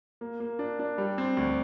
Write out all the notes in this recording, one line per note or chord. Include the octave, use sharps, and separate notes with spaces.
A#3
A#3
D4
D4
G3
C4
D2